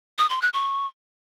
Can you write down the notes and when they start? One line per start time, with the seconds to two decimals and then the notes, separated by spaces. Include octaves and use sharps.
0.18 D#6
0.30 C6
0.42 F#6
0.53 C#6